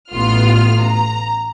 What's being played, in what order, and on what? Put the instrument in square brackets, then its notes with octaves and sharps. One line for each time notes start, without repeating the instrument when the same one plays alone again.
[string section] A1 B3 F4 F6
A#5